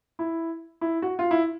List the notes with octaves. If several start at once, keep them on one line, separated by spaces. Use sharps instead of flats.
E4
E4
F#4
F4
E4